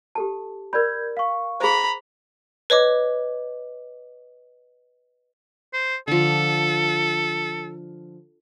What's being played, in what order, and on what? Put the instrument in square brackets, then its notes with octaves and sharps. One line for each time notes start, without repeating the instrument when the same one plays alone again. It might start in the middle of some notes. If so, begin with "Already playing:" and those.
[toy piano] G4 A4 A5
[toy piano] A#4 D5 B5 [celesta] G6 G#6
[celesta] F5 C#6
[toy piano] G#4 C5 [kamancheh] A#5 B5
[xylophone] B4 C#5 D#5 D6
[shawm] C5
[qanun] D3 F3 [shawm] A4